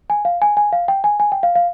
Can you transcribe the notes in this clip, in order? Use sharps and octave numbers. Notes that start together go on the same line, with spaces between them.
G#5
F5
G#5
G#5
F5
G5
G#5
G#5
G5
F5
F5